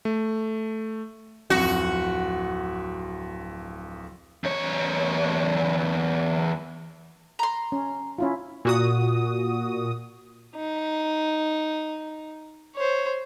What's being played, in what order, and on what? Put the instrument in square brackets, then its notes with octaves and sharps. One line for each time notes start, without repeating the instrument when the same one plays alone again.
[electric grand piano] A3
[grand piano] D1 F2 [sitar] F#4
[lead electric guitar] E2 C#5
[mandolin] A#5 C6
[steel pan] C#4
C#4 E4 F4
[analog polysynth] A#2 F#4 D#6
[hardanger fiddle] D#4
C5 C#5